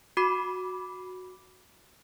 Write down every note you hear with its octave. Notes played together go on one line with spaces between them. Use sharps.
F#4 B5 D6 C7